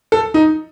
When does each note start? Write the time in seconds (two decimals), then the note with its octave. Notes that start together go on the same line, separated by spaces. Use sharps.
0.12 A4
0.34 D#4